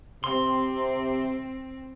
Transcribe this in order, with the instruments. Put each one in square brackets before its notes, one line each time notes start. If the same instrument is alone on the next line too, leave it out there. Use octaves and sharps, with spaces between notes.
[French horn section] C3 [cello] C4 [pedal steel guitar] C6